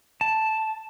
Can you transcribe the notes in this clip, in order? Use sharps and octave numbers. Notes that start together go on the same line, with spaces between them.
A5